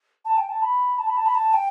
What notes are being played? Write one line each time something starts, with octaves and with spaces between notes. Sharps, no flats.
A5
G5
A5
B5
A5
B5
A5
B5
A5
G5